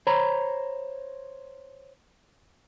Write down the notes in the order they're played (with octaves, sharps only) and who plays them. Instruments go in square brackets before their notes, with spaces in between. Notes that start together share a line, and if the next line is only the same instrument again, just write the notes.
[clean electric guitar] C5 C#5 A#5 B5